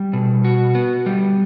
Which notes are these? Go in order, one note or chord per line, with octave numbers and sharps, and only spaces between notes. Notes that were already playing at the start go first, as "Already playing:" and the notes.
Already playing: G3
B2
F#4
B3
G3